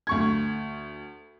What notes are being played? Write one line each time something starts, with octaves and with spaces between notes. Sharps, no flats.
D2 C#6 G#6